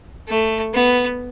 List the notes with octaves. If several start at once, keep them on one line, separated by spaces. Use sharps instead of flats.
A3
B3